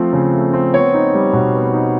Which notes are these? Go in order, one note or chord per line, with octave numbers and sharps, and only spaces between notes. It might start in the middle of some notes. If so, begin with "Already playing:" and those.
Already playing: F3 A3 C4
C#3
A3
C4
B3 C#5
D#4
G3
B2
B3
D#4